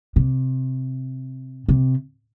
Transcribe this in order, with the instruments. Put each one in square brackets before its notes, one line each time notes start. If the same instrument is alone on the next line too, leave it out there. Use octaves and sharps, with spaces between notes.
[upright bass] C3
C3